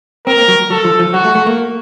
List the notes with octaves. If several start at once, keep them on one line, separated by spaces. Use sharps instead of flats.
C4 A#4
A#3
F#3
F#3 A4
F3
F3
F#3 F#4
A3
A3
A#3